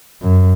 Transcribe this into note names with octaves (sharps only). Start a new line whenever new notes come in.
F#2